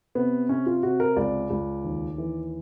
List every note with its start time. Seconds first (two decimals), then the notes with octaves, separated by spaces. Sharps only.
0.15 C3 B3
0.49 C3 C#4
0.66 F4
0.83 C3 F#4
1.00 A#4
1.16 C#2 D5
1.50 C#2
1.84 D#2
2.18 E3